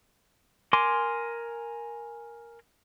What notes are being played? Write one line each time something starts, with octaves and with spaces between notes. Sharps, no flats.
A#4 G#5 C6 D6